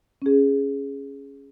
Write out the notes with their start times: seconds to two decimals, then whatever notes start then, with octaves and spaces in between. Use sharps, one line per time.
0.22 C#4 G#4